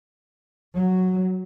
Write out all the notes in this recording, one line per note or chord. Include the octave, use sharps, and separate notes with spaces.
F#3